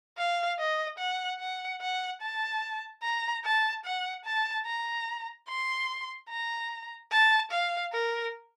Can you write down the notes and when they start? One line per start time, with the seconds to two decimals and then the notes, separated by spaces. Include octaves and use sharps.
0.18 F5
0.59 D#5
0.99 F#5
1.39 F#5
1.81 F#5
2.21 A5
3.03 A#5
3.44 A5
3.85 F#5
4.25 A5
4.66 A#5
5.48 C6
6.29 A#5
7.12 A5
7.51 F5
7.92 A#4